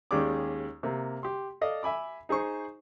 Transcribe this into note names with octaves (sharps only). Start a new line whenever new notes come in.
D#2 G#3 C#4 G4 D5 D6
C3 A#3
G4 C6
A4 D5 D#5 F5
E5 G#5 B5 D6
D#4 G#4 C5 C#6